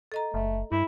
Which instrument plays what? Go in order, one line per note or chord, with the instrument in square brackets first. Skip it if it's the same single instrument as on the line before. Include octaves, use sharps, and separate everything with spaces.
[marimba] A4 D#5 A#5
[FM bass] F#1 [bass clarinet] A3
[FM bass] G2 [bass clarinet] E4